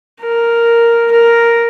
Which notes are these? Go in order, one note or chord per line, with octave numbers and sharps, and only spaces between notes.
A#4
A#4